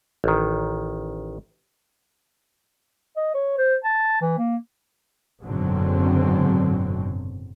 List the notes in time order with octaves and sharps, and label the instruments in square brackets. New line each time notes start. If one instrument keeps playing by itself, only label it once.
[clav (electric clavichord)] A1 D#3
[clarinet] D#5
C#5
C5
A5
E3
A#3
[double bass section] F#1 G#2 B2 D3 F#3 C4